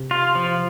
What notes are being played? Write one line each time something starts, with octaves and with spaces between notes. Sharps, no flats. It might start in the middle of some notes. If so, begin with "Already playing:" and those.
Already playing: C3
F4
F3